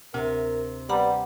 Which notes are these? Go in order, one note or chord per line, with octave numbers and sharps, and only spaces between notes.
D2 C3 A#4
G3 B3 F#5 A#5 B5